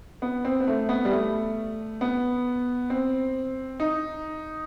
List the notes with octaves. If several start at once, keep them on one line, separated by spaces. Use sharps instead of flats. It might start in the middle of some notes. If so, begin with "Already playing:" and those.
B3
C4
B3
A3
B3
G3
A3
B3
C4
D#4